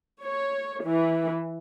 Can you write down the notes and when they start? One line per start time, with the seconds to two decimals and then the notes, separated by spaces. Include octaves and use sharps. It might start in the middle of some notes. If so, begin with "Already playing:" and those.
0.23 C#5
0.85 E3